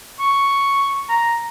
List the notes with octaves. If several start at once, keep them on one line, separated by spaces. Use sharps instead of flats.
C#6
A#5